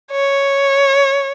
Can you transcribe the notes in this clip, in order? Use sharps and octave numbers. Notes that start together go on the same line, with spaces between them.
C#5